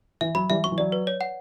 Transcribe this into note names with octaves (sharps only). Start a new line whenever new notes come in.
E3 E5
F#3 B5
E3 G3 E5
F#3 C#6
E3
F#3 D5
B4
C#5
F#5